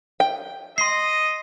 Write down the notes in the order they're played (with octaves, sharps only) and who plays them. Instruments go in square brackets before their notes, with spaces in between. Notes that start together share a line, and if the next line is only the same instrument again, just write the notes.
[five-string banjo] G5
[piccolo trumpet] D#5 [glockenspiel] C6 C7